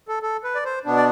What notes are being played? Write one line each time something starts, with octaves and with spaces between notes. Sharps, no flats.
A4
A4
B4
D5
C5
B2 B3 D4
D5